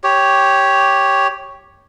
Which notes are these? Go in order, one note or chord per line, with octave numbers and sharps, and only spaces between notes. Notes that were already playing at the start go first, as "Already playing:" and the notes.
G4 C#5